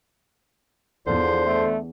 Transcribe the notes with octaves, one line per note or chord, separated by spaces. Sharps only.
E2 D3 F3 C5
A3